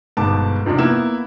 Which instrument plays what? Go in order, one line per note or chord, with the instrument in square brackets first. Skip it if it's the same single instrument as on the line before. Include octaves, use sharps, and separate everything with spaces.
[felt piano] G1 G#2 B2 B3 A5 D6
F2 C3 F3 D4
A#3 B3 E4 E7